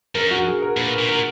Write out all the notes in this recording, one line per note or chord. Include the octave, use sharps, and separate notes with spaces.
F#2 A#4
F#4
G#4
A#4
A#2 B4
A#4
A#2
A#2 A#4